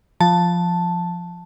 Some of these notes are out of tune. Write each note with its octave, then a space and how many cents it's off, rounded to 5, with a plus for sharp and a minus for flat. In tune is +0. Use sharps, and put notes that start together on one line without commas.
F3 +0 A5 +0